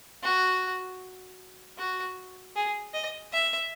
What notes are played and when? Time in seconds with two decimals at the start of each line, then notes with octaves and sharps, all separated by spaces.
0.24 F#4
1.78 F#4
2.56 G#4
2.94 D#5
3.32 E5